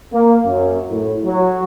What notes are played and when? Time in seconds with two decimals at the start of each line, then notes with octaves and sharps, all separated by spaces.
0.12 A#3
0.44 F#2
0.89 A2
1.24 F#3